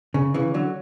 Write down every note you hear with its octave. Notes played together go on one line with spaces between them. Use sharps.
C#3
C#3 E3
D3 F#3